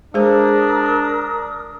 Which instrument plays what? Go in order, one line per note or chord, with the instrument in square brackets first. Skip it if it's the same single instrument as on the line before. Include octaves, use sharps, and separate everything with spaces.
[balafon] G#3 G#4 C5 [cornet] D4 [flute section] A#4 D#6